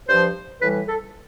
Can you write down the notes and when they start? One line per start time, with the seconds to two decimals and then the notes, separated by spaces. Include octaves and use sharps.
0.09 G2 F3 C5
0.62 A2 E3 G3 B4
0.88 A4